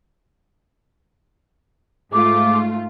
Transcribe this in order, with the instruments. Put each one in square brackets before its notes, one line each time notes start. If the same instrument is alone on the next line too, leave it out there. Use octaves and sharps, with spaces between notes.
[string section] G#2 A3 F4 [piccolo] D6